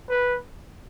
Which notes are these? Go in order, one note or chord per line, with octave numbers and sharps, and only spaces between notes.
B4